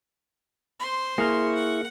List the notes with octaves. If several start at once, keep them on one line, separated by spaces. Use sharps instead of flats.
C5 C6
A#3 E4 G#4 C#6 F6
F#5